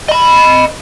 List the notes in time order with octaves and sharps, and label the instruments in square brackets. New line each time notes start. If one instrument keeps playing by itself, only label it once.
[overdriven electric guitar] D#5 B5